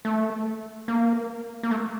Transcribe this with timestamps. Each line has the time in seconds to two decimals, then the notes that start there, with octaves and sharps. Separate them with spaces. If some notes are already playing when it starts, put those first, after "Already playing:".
0.05 A3
0.88 A#3
1.63 A#3
1.71 A3